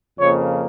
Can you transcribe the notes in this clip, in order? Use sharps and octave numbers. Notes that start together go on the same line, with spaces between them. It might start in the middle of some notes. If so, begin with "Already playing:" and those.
F2 C#3 F3 A#3 C#5